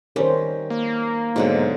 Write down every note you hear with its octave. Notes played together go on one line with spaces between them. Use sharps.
D#3 G3 C#4 A#4 C5
A#3
G#2 B2 D3 F#3